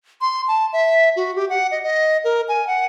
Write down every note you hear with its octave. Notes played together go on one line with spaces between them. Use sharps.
C6
A5
E5
F#4
G4
F#5
D#5
D#5
A#4
G#5
F#5